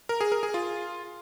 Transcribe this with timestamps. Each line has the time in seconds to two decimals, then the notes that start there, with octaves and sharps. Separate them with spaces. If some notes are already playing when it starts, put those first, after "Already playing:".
0.09 A#4
0.21 G#4
0.32 A#4
0.43 G#4
0.54 F4